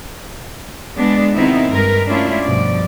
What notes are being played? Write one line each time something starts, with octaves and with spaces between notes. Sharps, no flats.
G#3 B3 D4
C3 D#3 B3 C4 D#4 E4
G2 G#3 A#4 B4
A3 C#4 D4 E4 F4
G2 B2 F3 D5